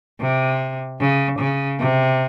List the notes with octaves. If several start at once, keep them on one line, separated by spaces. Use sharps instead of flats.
C3
C#3
C#3
C3